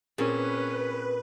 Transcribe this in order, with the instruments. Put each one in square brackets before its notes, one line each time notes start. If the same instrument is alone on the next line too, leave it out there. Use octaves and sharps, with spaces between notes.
[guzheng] A#2 [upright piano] C4 G#4 [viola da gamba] C#4 [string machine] B4